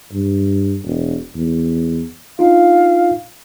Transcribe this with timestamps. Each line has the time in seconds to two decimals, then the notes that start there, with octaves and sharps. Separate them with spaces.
0.13 G2
0.86 E1
1.36 E2
2.39 D4 D#4 F4 F5